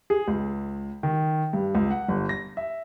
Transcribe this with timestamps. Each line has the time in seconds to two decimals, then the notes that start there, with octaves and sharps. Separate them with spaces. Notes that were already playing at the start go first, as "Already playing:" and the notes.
0.10 G#4
0.28 C#2
1.03 D#3
1.53 G2
1.75 C#2
1.91 F#5
2.08 G1
2.29 A#6
2.57 E5